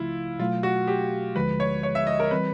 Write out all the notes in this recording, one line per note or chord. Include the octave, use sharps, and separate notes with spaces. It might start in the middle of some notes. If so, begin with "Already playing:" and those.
Already playing: C#2 C#3 F3 A3 E4 F4
B2 F#3 A3 F4
F#4
G4
D2 D3 F3 G#3 B4
C#5
C#5
E5
D#5
A#4
E3 G3 C4 B4